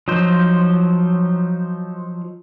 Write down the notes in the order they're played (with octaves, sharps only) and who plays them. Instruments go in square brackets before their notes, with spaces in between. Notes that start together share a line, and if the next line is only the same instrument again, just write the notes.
[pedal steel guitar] F3 F#3 D#4 C5